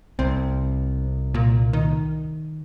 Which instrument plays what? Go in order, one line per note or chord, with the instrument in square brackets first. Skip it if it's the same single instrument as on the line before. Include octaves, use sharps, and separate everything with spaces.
[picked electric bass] C2 [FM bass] C4
[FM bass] A#2
D#3